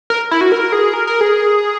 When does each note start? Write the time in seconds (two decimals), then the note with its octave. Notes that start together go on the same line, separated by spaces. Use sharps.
0.10 A#4
0.31 E4
0.41 F#4
0.52 A#4
0.72 G#4
0.94 A#4
1.07 A#4
1.21 G#4